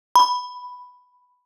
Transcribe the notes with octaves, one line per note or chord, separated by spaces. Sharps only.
B5